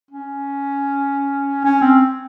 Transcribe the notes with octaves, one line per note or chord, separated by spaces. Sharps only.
C#4
C#4
C4